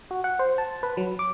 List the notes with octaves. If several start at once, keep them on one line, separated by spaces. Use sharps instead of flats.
F#4
F#5
C5
A5
B4
F#3
D6